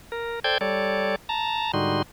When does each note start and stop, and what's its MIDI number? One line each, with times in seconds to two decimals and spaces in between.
0.12 0.40 70
0.44 0.58 69
0.44 0.58 72
0.44 0.58 74
0.44 0.58 79
0.44 0.58 91
0.44 0.58 92
0.61 1.16 55
0.61 1.16 69
0.61 1.16 73
0.61 1.16 74
1.29 1.72 81
1.29 1.72 82
1.74 2.02 44
1.74 2.02 50
1.74 2.02 55
1.74 2.02 63
1.74 2.02 66
1.74 2.02 84